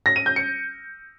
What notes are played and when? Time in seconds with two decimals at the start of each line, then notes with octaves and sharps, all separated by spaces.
0.06 A#6
0.16 D#7
0.26 G6
0.36 C#7